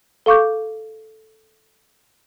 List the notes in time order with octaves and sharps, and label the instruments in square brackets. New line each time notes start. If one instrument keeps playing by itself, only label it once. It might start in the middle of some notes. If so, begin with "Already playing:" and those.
[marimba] A4 F5 C#6 D6 G6